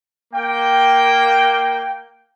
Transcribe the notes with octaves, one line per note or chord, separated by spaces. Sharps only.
A#3 G5